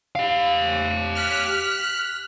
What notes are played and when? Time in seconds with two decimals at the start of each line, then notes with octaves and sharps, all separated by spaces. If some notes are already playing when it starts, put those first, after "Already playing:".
0.15 G4 F5
1.15 F6 F#6 B6